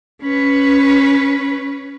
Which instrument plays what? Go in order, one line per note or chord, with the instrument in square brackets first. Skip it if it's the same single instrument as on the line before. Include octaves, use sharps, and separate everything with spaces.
[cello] C#4 B4